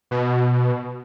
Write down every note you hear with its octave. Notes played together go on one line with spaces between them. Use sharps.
B2